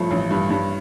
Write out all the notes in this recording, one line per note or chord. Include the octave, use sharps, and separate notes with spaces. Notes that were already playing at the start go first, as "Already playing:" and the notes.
Already playing: A1 G2 F3 A3
A1
G2
G2